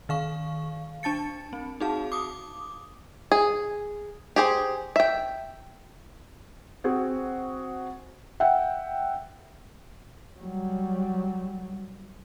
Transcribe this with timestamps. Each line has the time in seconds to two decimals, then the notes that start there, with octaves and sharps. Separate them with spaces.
0.09 D#3 F5 C#6
1.03 D4 A5 A6 C#7
1.53 C4
1.80 D#4 F#4 G#4 F5 A5
2.12 D6 D#6
3.32 G#4
4.36 G4 G#4 C5
4.96 E5 G5
6.84 C4 F#4 G#4
8.40 E5 F#5 G5
10.40 F#3 G3